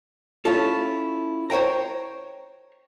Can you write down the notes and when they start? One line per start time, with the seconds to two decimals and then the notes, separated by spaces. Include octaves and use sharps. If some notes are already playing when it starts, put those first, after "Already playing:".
0.45 C#4 E4 F4 A4
1.50 C5 C#5 E5 G5 A#5